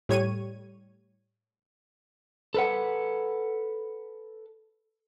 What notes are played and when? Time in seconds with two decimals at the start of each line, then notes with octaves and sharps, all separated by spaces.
0.09 A2 G3 C#5 G#6 D#7
2.54 A4 B4 F#5